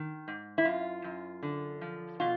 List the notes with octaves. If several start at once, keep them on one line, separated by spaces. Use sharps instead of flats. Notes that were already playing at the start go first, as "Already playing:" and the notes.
Already playing: D#3
G#2
E4
F#2 F4
F#2
D3
F3
B2 F4